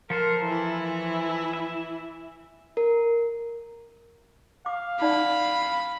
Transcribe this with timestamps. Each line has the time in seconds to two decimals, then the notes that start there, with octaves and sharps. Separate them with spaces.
0.10 F3 A4 A#4 C5
0.45 E3 E4
1.53 E5
2.77 A#4
4.66 F5 D6
5.01 D#4 D5 F#5 B5